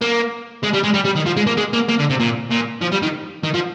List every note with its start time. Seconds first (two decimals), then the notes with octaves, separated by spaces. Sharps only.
0.01 A#3
0.64 G#3
0.74 G3
0.84 G#3
0.95 G3
1.05 G3
1.16 D#3
1.26 F3
1.37 G#3
1.47 A#3
1.57 G#3
1.73 A#3
1.88 A#3
1.99 D3
2.10 C3
2.20 A#2
2.51 A#2
2.81 F3
2.92 G3
3.02 D#3
3.44 D#3
3.54 F3